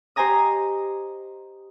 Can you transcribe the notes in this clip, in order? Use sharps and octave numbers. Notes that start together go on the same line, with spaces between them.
G4 C5 D#5 G#5 A#5 D#6